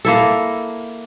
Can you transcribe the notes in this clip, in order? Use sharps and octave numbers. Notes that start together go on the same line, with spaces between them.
A#3 E4 A4